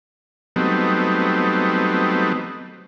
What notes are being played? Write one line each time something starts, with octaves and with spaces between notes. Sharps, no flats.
F#3 G3 A3 B3 C4 D#4